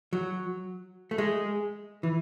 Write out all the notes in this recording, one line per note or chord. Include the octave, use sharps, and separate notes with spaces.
F#3
A3
G#3
E3